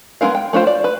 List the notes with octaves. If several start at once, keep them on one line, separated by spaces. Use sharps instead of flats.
G#3 B3 D#4 A#4 F5
G5
A3 C#4 F4 C5 G5
D5
B4